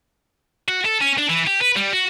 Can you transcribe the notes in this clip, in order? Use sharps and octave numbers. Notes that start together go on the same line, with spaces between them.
F#4
A4
C#4
D4
E3
G4
B4
G3
F#4